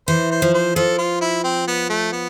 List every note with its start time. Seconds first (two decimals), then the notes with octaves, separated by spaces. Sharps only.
0.08 E3 C5
0.31 C5
0.42 F3
0.54 C5
0.75 F3 A4
0.98 F4
1.21 E4
1.44 C4
1.68 B3
1.89 A3
2.12 B3